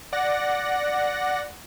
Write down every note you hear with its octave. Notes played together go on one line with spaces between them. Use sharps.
D5 F#5 A#6